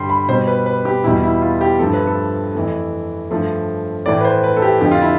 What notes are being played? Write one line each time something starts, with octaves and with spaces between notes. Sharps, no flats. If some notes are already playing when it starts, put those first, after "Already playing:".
Already playing: G2 D3 G3 C6
B5
B2 G3 C5
B4
B4
G4
E2 B2 G3 E4
E4
F4
G4
G2 F3 A3 A4
B4
A4
F2 E3 A3
G2 F3 A3
A2 E3 A3 D5
B4
C5
B4
A4
G4
F2 D3 F3 G4
F4
E4